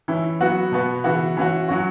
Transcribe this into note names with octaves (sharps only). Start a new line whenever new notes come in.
E3 C#4 E4
F#3 B3 F#4
B2 B3 F#4
C#3 E3 B3 F#4
E3 C#4 F#4
F#3 C#4 F#4